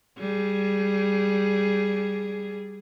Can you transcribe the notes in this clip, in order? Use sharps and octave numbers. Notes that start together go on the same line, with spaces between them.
G3 G#4